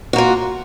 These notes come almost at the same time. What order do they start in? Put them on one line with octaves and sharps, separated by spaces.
F#4 A#3 F4